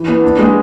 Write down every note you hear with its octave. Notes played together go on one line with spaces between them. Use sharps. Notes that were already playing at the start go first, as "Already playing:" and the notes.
Already playing: E3
B3
D4
G#3